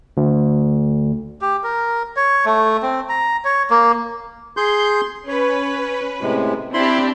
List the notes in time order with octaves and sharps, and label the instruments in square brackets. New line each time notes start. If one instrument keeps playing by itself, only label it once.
[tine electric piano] D2
[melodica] G4
A#4
C#5
A3
C4
A#5
C#5
A#3
[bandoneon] G#4 C6 G6
[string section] C#4 B4 [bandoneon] C#5
[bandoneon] A2 C3 G#3
[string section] C4 D4 G4 [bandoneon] E4 B5 C6